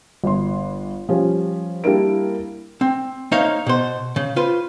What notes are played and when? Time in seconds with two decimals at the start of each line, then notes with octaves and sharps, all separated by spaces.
0.24 G1 C6
1.09 F3 G3 C#4
1.84 G3 A#3 D4 E4 A#4 D7
2.81 C4
3.32 A#3 D#4 C5 C#5 E5 F5
3.66 B2 C5
4.16 C#3
4.36 F4 B4 C5